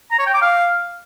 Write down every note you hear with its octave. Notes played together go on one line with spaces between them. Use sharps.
A#5
C#5
G5
D6
F5